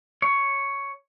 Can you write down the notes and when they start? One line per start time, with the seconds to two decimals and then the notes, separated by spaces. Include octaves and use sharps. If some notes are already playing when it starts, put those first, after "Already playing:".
0.22 C#5